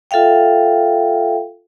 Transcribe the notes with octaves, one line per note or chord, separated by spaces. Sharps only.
F4 A4 E5 F5 G5